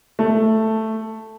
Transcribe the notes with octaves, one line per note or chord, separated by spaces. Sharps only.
A3